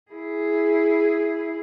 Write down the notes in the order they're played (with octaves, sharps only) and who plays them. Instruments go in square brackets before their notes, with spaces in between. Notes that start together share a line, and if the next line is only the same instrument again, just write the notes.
[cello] E4 G#4